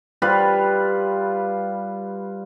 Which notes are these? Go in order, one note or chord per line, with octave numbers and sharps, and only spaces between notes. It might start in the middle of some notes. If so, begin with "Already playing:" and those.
G3 F4 B4